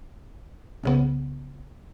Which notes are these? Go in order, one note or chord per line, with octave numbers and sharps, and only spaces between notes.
C2 C#3 B3